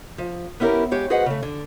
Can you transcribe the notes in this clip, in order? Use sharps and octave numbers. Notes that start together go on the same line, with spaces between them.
F3
B3 C#4 E4 G4 A#4
G#3 G4 C#5
F#4 G#4 B4 C5 D#5 F#5
C#3 A3
D3